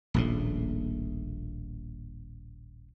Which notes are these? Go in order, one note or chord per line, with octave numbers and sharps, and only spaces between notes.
D#1 A#1 A2